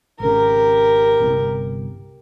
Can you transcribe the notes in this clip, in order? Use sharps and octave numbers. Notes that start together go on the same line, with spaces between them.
G#1 C#3 G4 A#4
G1 C2